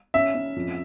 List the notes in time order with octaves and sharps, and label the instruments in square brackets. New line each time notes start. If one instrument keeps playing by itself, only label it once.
[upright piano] C#4 [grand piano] E5
[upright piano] C#4
F2